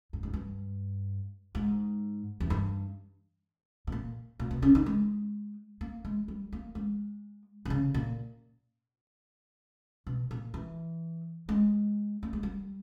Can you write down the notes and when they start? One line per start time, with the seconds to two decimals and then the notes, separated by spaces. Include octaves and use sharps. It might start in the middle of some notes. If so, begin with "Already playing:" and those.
0.13 G2
0.23 G#2
0.33 G2
1.55 G#2
2.40 E2
2.50 G2
3.87 B2
3.92 A#2
4.39 A#2
4.51 B2
4.62 C#3
4.75 D#3
4.86 G#3
5.81 A#3
6.05 G#3
6.28 G3
6.52 A#3
6.75 G#3
7.65 B2
7.70 C#3
7.94 A#2
10.07 B2
10.31 A#2
10.54 E3
11.49 G#3
12.23 A#3
12.33 G#3
12.43 G3